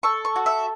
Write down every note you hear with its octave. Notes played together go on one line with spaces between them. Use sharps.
A4 C#6
C#6
F#4
E5